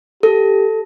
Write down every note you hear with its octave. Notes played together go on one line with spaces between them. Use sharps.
G4 A4